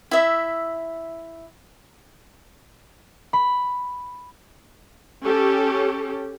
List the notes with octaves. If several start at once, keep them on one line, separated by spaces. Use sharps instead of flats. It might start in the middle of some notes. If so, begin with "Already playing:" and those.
E4 E5
B5
C#4 G4 A4